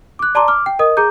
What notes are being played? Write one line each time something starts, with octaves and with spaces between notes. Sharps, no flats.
D6 F#6
D5 A5 A#5 C6 D6
D6 F6
G5
A#4 D#5 D#6
G#4 A#5 D6 G6